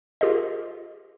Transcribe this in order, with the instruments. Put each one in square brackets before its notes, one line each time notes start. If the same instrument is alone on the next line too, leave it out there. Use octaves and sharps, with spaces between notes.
[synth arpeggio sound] F4 G4 G#4 A#4 C5 D#5